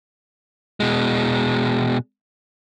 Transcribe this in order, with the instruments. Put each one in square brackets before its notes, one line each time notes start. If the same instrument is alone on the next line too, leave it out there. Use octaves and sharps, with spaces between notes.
[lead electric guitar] B2 G#3